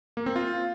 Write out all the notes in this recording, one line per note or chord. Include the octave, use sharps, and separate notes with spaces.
A#3
C4
F4